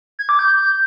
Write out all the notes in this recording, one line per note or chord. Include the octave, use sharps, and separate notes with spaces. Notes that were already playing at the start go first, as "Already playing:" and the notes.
G#6
D6
G6